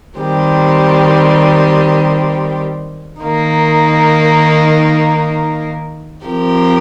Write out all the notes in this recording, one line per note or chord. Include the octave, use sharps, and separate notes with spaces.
D#3 G3 C4 G4
D#3 A#3 D#4
F3 C4 G4 A#4